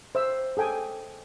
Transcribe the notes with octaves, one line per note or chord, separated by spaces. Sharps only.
C5 E5 E6
G#4 A4 G5 G#5